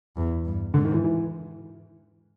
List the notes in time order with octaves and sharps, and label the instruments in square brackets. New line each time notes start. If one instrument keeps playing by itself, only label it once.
[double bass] E2
G2
[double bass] G#2 [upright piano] D3
[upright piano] D#3
E3
E3